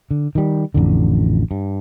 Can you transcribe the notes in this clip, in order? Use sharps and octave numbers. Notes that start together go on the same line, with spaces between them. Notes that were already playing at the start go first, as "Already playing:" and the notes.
D3
D#3 G3
A1 F2 D3
G2